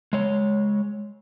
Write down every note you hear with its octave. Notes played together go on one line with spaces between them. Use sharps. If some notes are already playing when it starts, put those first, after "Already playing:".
G#3 C#5